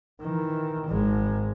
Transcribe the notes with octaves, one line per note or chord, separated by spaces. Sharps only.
D#3 E3
G#1 G#3